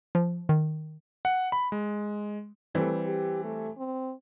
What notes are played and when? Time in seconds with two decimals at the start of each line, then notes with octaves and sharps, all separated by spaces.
0.15 F3
0.49 D#3
1.25 F#5
1.52 B5
1.72 G#3
2.75 E3 G3 A3 C4
3.05 G4
3.44 A3
3.77 C4